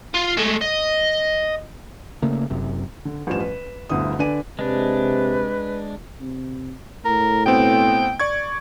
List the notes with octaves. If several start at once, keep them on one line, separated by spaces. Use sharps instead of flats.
F4
G#3 A3
D#5
C#3 A3 A#3
F#1 F#2 C3
D3
A1 G2 F3 G3 E7
B4
G1 D2 D3 B3 E4 D#6
D3 D4 B4 D5 G#5 D#7
C3 G#3 D4 B4
C3
A2 A#4
B2 B3 C4 G5
D5 C#6 G#6